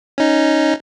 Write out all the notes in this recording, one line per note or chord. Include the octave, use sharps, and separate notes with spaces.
C#4 D#4